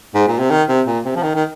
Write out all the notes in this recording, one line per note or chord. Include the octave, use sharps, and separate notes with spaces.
G#2
A#2
C3
D#3
C3
A#2
C3
F3
D#3
D#3